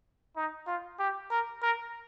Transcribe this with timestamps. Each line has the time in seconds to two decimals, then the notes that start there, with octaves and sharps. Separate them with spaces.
0.36 D#4
0.67 F4
0.99 G4
1.31 A#4
1.62 A#4